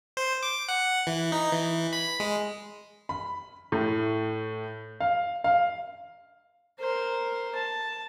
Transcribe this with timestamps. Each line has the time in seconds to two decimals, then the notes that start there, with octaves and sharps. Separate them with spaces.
0.17 C5
0.43 D6
0.68 F#5
1.07 E3
1.32 D#4
1.51 E3
1.93 B5
2.20 G#3
3.09 B5
3.72 A2
5.00 F5
5.44 F5
6.80 A#4 C5
7.56 A5